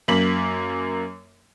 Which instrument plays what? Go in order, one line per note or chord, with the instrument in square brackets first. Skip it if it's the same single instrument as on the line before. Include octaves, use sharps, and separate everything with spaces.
[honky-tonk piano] F#2 A#3 B6 F#7